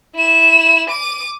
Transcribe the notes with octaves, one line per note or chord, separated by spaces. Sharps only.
E4 E7
D6 D#7